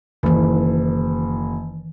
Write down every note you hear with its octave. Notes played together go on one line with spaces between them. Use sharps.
F#1 D#3 E3